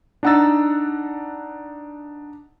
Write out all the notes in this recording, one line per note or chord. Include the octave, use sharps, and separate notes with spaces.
D4 D#4 F#5 A#5 E6 A6